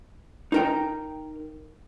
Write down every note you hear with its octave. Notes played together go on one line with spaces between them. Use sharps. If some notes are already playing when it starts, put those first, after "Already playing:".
D#4 A#4 G5